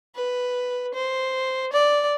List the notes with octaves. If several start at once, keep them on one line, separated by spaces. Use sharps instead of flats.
B4
C5
D5